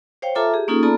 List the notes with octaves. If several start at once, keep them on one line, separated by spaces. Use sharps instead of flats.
C5 C#5 F5 G5
F4 A4 E5 A5 A#5 D6
G4 G#4
A#3 C#4 D#4 F4 G#4 A4
B3 F4 A4 D5 A5 A#5